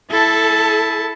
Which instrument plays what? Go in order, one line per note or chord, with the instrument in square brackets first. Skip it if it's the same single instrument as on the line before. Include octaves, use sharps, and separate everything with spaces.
[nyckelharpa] E4 A5 [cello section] A4